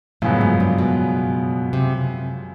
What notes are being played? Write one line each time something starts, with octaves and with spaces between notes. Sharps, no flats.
F#2 A2 C#3 F3 G#3 B3
G#2
G2
B2
C3